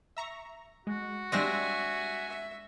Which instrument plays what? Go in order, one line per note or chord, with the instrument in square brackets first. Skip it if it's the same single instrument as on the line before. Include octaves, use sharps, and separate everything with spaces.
[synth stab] E5 A#5 C#6
[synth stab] G#3 [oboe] F#4
[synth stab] G3 A#6 [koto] G#3 C4 D4 [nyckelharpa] E5 G#5
[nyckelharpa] E5